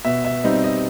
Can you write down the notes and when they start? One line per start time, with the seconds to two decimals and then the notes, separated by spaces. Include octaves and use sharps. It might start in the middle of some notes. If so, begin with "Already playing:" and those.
0.05 B2 E5
0.25 E5
0.44 G3 C4 D#4 D#5
0.64 D#5